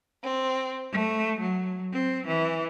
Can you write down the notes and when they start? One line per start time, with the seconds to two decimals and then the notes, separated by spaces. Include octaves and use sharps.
0.23 C4
0.91 A3
1.40 F#3
1.93 C4
2.27 E3